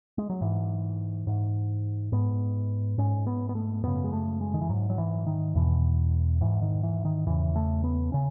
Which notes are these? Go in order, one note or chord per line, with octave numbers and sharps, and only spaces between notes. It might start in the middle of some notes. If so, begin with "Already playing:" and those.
G#3
F#3
G#2 E3
G#2
G#2 B3
G#2 C#4
B3
B3
A3
F#2 C#3 B3
G#3
A3
G#3
D#3
E3
G#2 F#3
F#3
E3
D#3
E2 B2 E3
G#2 E3
D#3
E3
D#3
E2 C#3 E3
A3
B3
C#3 C#4